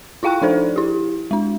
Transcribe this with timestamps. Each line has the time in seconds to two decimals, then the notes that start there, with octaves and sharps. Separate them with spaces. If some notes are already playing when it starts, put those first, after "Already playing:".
0.23 E4 F4 F5 G5 C#6 F#6
0.42 F3 D4 D#4 A4 C5 D5
0.76 E4 G4
1.31 G#3 D4